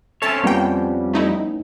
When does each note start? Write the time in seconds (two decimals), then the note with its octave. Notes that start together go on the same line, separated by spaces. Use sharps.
0.22 C4 C#4 A4 C#5 E5 A5 E6
0.44 F2 G3 A#3 B3 C#4 G5
1.13 A3 D#4 E4